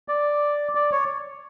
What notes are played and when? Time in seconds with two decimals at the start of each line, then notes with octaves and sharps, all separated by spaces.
0.08 D5
0.75 D5
0.92 C#5